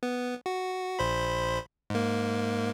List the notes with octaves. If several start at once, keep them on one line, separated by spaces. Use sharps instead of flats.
B3
F#4
A#1 C5 B5
G#2 A#3